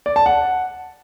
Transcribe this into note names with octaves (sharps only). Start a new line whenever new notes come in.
D5
A5
F#5